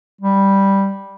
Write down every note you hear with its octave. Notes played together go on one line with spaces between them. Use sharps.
G3